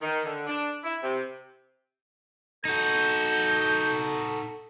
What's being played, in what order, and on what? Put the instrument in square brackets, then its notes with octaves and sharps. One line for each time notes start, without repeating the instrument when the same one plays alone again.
[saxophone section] D#3
D3
D4
E4
C3
[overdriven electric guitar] D#4 F#4 [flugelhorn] A4 [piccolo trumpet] G6